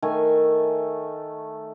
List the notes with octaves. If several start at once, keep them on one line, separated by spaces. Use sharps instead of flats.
D#3 A3 G#5